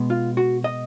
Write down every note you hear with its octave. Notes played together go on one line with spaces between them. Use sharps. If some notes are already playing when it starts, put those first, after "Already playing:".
Already playing: B2 G#3 B3
F4
F#4
D#5